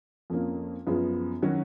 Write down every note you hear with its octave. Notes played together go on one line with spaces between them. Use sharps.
F2 F3 A#3 C#4
F#2 F3 B3 F4 G#4
D#3 F#3 C#4 F#4